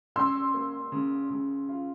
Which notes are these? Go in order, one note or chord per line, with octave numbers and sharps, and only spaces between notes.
C#4 C6 E6
A#3
C#3
C#3
F4